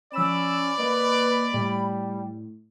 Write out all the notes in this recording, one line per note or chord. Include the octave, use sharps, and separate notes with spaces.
F3 C#4 D5 B5 E6 E7
A#3 B4 D#5
A2 G3